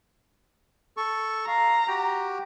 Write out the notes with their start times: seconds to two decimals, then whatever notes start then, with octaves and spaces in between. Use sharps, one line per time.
0.97 A4 C#6
1.48 F5 A#5
1.88 F#4 G4 G5